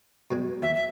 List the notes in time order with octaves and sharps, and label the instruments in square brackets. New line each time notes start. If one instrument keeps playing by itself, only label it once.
[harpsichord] B2 G3 G#3
[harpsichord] D#2 [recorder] E5
[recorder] E5